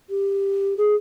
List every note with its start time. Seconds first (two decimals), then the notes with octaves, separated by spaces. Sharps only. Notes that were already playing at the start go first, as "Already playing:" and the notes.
0.10 G4
0.77 G#4